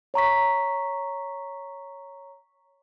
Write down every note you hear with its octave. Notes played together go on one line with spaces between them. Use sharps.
C#5 A#5 C#6 B6